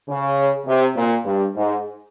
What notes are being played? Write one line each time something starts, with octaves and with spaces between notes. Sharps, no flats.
C#3
C3
A#2
G2
G#2